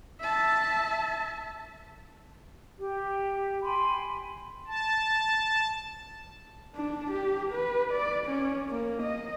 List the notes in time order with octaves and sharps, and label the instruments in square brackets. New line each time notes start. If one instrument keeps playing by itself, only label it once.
[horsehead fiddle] E5 A5
[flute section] G4
G5 G#5 B5 C6
[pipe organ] A5
[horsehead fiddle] D4
G4
B4
D5
C#4
A#3
D#5